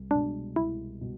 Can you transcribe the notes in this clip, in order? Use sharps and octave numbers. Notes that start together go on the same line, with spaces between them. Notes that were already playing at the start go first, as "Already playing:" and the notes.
Already playing: C2
B2 G#3 D4
C2 E4
B2